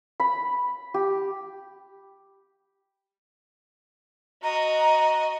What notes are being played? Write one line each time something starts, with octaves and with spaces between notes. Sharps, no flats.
B5
G4
F#4 D#5 A#5